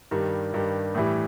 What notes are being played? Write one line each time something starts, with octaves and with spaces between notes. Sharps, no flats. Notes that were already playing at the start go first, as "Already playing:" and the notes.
G2 D#3 G3
G2 D#3 G3
A2 E3 G3